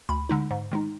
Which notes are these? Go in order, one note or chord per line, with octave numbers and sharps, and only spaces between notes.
D2 B5
D3 G#3 D#4
G#2
D#3 G#3 D#4